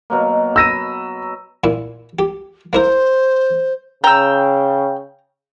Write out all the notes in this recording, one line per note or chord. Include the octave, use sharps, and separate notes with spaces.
B2 F#3 A#3
B5 E6 A#6 D#7
A#2 E4
G4
A#3 E4 A#4 C5
C#3 G5 A#5 E6